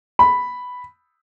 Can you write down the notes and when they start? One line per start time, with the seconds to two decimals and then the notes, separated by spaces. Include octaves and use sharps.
0.19 B5